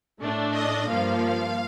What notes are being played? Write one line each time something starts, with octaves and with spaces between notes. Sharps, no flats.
A2 A3 D4
D#5
G2 F3 A#3 F5